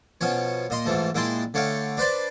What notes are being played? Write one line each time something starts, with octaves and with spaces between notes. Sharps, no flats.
B2 F3 C#4 C#5
A#2 D#5 C6
G#2 E3 F3 A3
A#2 G#3 E4 G5 A5 C6
D3 A3 C#5 F5 G5
D4 B4 C5 D5